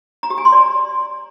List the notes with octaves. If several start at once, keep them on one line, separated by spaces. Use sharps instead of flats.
A#5
G4
G#5
C6
D5